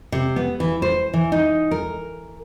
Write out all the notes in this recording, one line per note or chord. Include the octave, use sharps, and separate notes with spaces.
C3
B3
E3
C5
E3
D#4
A#4